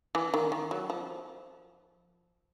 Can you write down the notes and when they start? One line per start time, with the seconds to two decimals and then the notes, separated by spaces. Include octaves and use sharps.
0.15 E3
0.34 D#3
0.52 D#3
0.71 F#3
0.90 F3